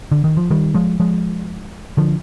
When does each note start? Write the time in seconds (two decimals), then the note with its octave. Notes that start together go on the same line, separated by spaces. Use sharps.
0.12 D3
0.24 D#3
0.37 F3
0.50 D#3 G3
0.74 F3 G#3
1.00 F3 G#3
1.97 D3 F3